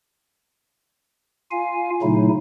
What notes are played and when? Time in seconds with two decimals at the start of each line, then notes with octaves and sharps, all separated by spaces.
1.51 F4 F5 G#5
2.02 A#2 C#3 F#3 A3 D#4 E4